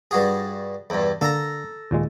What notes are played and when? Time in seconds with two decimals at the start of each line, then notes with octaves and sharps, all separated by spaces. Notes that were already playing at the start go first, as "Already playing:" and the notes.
0.11 G2 F#4 G#4
0.90 E2 G2
1.21 D3 A#3 A4 A#5
1.91 D#2 A#2 G#3